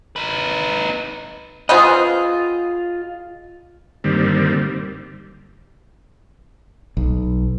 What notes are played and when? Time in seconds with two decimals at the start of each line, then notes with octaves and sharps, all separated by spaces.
0.16 D#4 B4
1.69 B3 C4 F4 G#4 D#5
4.04 G2 D3 D#3 G3 A#3 C4
6.97 B1